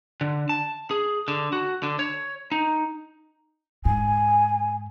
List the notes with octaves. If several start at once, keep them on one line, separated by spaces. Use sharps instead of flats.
D3
A5
G#4
D3
F#4
D3
C#5
D#4
G#2 G#5